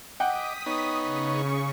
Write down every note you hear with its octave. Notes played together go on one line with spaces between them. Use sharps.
D#5 F#5 G5 D6 D#6 B6
B3 D#4 C#5
C#3 C#6